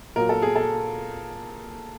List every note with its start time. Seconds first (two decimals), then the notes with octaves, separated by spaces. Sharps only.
0.16 A#2 F#3 A#4
0.29 A4
0.42 G#4
0.56 A4